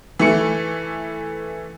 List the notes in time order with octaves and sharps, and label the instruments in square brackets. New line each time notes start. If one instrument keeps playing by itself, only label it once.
[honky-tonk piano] E3 A3 C#7